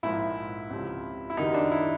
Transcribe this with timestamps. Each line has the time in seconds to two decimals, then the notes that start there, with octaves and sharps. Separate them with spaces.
0.03 A#1 G#2 F3 E4
0.70 C#2 C3 F3
1.30 E4
1.37 F#2 D#3 G3 D#4
1.54 D4
1.71 E4